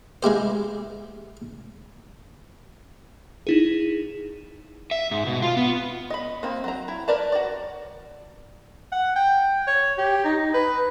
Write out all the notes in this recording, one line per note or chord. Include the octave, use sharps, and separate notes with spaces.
G#3 E4 G4 C5
D#4 E4 G#4
E5
G#2
B2
F4
B3
D#5 B5
A#3 C4
F#3 A#5
E4
A#4 B4 D5 A5 A#5
F#4 D5
F#5
G5
C#5
G4
D#4
B4